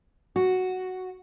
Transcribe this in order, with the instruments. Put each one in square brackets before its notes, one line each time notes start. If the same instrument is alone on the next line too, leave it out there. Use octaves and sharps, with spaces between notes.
[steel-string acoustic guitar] F#4